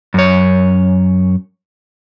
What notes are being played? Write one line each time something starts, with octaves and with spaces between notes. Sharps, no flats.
F#2 C#5